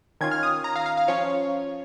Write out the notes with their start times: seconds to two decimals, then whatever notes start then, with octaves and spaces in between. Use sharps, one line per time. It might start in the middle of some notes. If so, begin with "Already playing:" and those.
0.21 D#3 C#4 F4 G#6
0.31 F6
0.43 D#6
0.64 A#5
0.76 F5
0.86 F5
0.97 F5
1.08 F3 C#4 F4 C#5